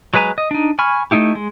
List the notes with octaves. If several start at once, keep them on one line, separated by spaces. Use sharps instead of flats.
F#3 G#3 B4 G#5 A#5
D#5
D4 D#4
G#5 B5 C#6 F6
A3 A#3 D#4 E4 G4
G#3